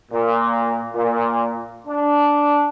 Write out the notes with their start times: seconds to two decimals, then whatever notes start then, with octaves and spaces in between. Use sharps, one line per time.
0.12 A#2
0.94 A#2
1.87 D4